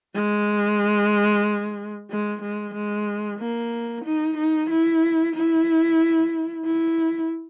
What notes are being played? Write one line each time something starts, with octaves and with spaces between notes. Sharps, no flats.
G#3
G#3
G#3
G#3
A#3
D#4
D#4
E4
E4
E4